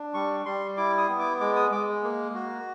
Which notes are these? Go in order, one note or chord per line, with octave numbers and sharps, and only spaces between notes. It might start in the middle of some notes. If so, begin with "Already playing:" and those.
Already playing: D4
G3 C#6
G3 C6
E4 D6
D#6
B3
D6
G#3 D6
D#6
G#3 D6
A#3
F#4